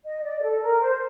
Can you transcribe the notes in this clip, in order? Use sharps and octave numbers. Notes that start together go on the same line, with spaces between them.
D#5
D5
A4
A#4
C5